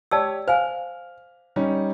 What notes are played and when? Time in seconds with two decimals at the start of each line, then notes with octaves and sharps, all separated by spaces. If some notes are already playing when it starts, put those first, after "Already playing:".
0.11 G4 C#5 D5 A5 E6
0.48 C5 F5 G#5 F6
1.56 G3 C#4 D#4